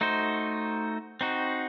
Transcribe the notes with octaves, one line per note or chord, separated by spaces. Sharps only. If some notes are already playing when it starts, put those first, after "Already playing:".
A3 D#4 F#4 C5
C4 D#4 F#4